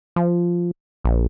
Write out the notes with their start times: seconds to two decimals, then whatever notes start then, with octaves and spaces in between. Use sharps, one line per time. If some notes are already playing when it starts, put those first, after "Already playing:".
0.16 F3
1.04 A#1